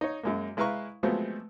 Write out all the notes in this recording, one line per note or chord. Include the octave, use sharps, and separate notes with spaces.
D#4 C#5
F#2 G#3 A#3
G#3 E4 B4 F5 A#5 C#6
F3 F#3 G#3 A3 B3 C4